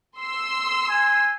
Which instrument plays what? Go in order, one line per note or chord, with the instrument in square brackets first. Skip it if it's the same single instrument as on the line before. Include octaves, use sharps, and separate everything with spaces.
[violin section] C6 E6
[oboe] G#5